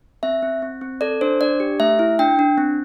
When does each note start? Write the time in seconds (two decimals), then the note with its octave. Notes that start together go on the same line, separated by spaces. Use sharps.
0.23 C4 E5
0.42 C4
0.62 C4
0.81 C4
1.01 A4 D5
1.21 D4 C5
1.41 D4 D5
1.60 G4
1.80 A3 E5
1.99 E4
2.19 D4 G5
2.39 D4
2.58 C4